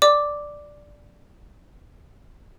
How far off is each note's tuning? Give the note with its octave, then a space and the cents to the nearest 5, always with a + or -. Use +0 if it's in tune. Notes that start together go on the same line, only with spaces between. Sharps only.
D5 +0 D6 +0